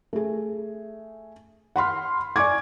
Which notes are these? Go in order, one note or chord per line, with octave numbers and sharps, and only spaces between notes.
A3 G#4
F#5 B5 C6 F6
D5 G#5 C#6 D6 G#6